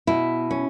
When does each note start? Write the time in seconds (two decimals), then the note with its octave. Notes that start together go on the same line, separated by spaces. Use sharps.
0.07 B2 E4
0.51 C#4